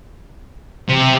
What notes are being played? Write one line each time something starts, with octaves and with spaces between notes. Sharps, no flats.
C3